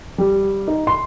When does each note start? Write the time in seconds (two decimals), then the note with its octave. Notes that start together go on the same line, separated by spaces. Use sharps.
0.18 G3
0.68 D#4
0.87 C6